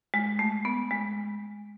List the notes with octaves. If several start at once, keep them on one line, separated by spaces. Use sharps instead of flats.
G#3
A3
B3
G#3